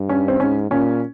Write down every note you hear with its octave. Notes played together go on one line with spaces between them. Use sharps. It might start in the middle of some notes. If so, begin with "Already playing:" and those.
Already playing: G2
C#4
C4
G#2 C#4
A#2 C#4